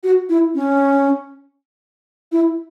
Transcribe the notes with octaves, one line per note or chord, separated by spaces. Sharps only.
F#4
E4
C#4
E4